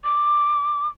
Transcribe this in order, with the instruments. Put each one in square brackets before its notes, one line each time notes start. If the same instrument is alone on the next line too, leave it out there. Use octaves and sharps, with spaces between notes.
[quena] D6